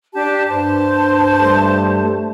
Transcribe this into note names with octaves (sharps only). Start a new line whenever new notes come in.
D4 G4 A5
G2 C5 A5
G3 A3